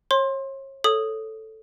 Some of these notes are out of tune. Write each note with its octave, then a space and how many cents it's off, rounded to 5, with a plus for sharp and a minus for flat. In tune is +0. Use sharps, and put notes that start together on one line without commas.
C#5 -40 C6 +20
A4 +0 C#5 +0 D#6 -5